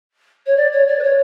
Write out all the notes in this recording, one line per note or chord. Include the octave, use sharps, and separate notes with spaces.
C#5
D5
C#5
D5
B4
C#5